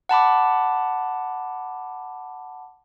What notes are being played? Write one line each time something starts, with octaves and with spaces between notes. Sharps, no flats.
F#5 A5 B5 D6